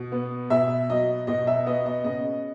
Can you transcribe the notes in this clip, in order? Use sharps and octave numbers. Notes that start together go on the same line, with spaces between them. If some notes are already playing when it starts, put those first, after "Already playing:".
Already playing: B2
B3
B2 E5
F#3 D#5
B2 D#5
E5
B3 D#5
D#5
C#3 D#5